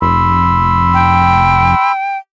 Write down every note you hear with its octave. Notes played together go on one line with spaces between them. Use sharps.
F1 B5 C6 E6
G5